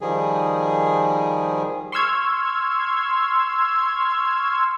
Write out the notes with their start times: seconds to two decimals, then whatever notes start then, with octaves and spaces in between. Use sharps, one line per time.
0.01 D#3 F3 G3 G#4
1.92 C6 C#6 E6 F6 G#6